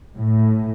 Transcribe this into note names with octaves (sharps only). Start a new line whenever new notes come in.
A2